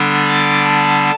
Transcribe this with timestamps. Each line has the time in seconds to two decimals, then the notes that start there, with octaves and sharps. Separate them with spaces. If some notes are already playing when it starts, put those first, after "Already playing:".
Already playing: D3 G3 B3 D4
0.26 D6
0.64 A5